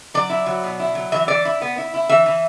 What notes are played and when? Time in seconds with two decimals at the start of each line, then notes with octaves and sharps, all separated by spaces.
0.14 F#3 D5
0.30 E4
0.46 F#3
0.64 B2
0.80 E4
0.95 F#3
1.12 E3 E5
1.28 E3 D5
1.45 E4
1.62 B3
1.78 E4
1.94 E4
2.09 E3 E5
2.26 E3